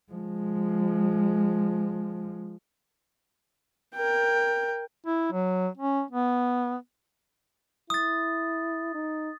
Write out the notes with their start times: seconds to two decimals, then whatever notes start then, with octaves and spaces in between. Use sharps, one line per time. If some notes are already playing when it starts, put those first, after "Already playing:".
0.12 F3 G#3
3.95 A#4 G5
5.06 E4
5.32 F#3
5.77 C#4
6.11 B3
7.90 E4 D#6 A6
8.94 D#4